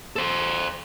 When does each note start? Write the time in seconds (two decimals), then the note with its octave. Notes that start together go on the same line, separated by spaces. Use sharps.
0.16 A4 C5